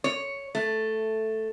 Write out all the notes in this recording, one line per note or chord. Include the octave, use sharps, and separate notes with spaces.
C#5
A3